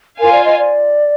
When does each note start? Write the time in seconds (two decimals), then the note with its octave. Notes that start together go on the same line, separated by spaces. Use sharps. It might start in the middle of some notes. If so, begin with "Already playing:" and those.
0.19 F4 A#4 C5 F5 G#5
0.32 D5
0.45 D#5
0.58 D5